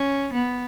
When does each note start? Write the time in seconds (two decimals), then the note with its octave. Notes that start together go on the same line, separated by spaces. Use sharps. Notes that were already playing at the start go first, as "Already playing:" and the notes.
Already playing: C#4
0.33 B3